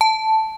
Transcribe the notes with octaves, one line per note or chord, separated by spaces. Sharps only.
A5